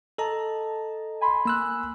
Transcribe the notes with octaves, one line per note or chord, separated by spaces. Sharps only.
A4 D#5 A5 A#5
G#5 B5 C6
A#3 E6 F#6